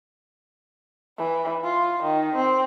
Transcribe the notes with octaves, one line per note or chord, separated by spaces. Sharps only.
E3
F4
D#3
C4